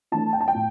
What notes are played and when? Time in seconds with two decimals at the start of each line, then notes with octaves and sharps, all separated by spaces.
0.12 E3 A3 D4 A5
0.33 G5
0.41 A5
0.48 G5
0.54 A2